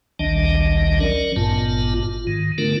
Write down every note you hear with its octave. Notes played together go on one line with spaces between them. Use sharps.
A1 D2 D#3 G3 D4 D#5
F#3 C#4 A#4 D5
G#1 G2 A#2 B3 F4 A5
F4
G#2 D#3
D3 A3 B3 D4 F4 A#4